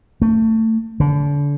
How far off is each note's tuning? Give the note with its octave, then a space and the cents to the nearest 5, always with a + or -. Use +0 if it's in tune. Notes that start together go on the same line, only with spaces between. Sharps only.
A3 +25
D3 -35